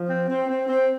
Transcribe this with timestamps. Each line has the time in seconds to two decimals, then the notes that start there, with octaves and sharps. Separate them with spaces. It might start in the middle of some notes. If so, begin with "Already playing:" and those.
Already playing: F3
0.08 C4
0.28 C4
0.48 C4
0.68 C4